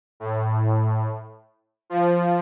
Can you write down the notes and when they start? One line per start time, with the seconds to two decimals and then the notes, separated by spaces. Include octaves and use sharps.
0.20 A2
1.90 F3